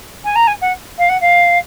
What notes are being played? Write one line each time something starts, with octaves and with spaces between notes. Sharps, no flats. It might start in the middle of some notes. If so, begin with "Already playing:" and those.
G#5
A#5
G#5
F#5
F5
F#5
F5